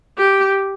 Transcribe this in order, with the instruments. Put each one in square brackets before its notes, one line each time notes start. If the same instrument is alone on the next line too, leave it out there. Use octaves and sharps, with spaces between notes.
[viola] G4